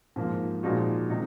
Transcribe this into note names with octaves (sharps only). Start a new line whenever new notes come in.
G#2 F3 A#3
A#2 F3 G#3 D#4 F#4
C3 D#3 G#3 D#4